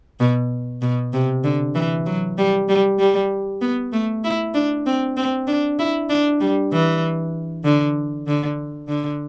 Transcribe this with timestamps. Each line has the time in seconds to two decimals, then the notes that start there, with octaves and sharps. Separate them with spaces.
0.20 B2
0.82 B2
1.13 C3
1.44 D3
1.75 E3
2.06 F#3
2.38 G3
2.69 G3
2.99 G3
3.61 B3
3.92 A3
4.24 E4
4.54 D4
4.86 C4
5.17 C4
5.47 D4
5.79 E4
6.09 D4
6.40 G3
6.72 E3
7.64 D3
8.27 D3
8.88 D3